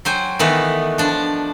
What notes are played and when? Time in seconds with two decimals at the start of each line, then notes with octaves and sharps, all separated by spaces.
0.05 F#3 C5 G5 G#5
0.39 D#3 E3 A3 B3
0.98 F3 D4